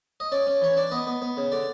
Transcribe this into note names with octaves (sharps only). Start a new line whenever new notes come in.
D#5
C#4 D5
C#4
E3 C#5
D4 D5
B3 D#5
B3
B3
C#3
D3 D5